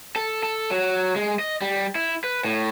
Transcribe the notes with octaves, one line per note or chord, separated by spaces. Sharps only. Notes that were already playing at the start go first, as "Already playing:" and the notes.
A4
A4
F#3
G#3
D#5
G3
E4
B4
A2